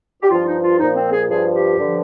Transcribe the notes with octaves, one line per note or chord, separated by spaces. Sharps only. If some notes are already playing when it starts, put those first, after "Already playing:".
G4
G2 F3 F4
D#4
F4
A#2 F3 D#4
C4
G#4
G2 F3 G#4
G4
G2 D3 F3